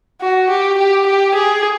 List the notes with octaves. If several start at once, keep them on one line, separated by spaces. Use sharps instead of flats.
F#4
G4
G4
G4
G#4